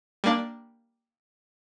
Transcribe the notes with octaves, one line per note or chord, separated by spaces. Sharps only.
G3 A#3 D4